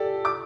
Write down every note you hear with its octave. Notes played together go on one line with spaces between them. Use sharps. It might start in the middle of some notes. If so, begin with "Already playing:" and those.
Already playing: G4 A4 D5
D6